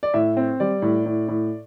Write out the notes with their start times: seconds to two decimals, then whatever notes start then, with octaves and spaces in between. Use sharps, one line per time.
0.03 D5
0.14 A2 E5
0.37 C4
0.60 G3 D5
0.82 A2
1.06 A2
1.28 A2